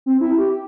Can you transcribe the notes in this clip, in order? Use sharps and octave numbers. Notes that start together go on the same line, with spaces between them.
C4
E4
G4